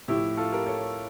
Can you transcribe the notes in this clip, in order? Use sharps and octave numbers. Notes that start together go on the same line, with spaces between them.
A2 F3 E4 G4
F4 A4
G4 A#4
A4 C#5